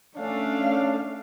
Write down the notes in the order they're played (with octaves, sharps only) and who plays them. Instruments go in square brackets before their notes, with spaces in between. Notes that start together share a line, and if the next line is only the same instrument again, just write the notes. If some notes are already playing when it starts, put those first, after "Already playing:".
[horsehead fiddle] A3 F5 [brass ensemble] C#4 D4